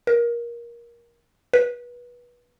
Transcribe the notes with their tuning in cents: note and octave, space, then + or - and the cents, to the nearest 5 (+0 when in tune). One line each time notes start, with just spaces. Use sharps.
A#4 +20
B4 -25